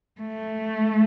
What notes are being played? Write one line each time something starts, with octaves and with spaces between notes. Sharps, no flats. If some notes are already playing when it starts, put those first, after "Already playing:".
A3